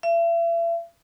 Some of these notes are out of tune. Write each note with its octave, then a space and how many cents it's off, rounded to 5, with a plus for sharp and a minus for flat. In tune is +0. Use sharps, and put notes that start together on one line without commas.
E5 +40